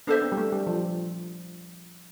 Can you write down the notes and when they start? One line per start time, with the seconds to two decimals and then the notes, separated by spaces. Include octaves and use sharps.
0.07 B3 D4 A4 C5 E5
0.22 C4
0.32 G3
0.37 A3
0.52 G3
0.67 F3